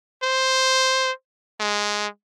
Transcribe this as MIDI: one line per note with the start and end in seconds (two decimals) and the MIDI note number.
0.23 1.11 72
1.60 2.07 56